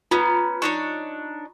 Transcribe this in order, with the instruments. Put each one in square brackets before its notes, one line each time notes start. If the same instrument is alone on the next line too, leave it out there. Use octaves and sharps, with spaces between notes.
[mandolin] B3 C#4 [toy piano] F4 [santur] A#5 B5
[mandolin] D4 D#4 C#5 [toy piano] C#6